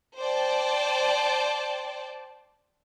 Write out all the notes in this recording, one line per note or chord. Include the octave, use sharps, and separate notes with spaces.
C5 D5 G5 A5